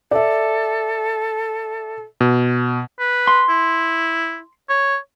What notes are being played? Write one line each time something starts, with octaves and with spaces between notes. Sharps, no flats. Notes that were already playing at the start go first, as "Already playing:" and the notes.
A4 D5 E5
B2
B4
C6
E4
C#5